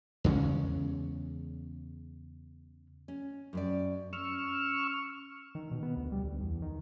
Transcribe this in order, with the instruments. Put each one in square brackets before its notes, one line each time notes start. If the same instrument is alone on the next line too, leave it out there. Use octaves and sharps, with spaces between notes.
[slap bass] E2 C#3 G#3 C#4
[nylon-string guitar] C#4
F#2 C4 D5
[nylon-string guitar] C#4 [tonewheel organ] C#6 E6 F6
[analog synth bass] D#3
B2
B3
D2
G3
D2
E2
D#3